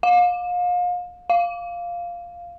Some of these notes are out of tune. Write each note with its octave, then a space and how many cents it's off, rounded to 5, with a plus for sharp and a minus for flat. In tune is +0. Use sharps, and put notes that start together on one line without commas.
F5 +35
F5 +0